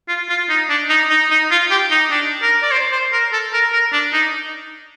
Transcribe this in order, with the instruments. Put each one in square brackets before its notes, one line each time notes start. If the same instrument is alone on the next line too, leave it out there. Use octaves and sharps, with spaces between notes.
[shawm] F4
F4
D#4
D4
D#4
D#4
D#4
F4
G4
D#4
D4
A#4
D5
C5
C5
A#4
A4
A#4
A#4
D4
D#4